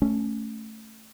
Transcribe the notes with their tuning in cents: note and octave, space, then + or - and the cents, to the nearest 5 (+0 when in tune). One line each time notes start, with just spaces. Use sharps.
A3 +0 C#4 +0